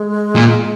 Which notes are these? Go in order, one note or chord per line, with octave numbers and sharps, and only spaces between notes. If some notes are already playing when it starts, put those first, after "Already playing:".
Already playing: G#3
A#2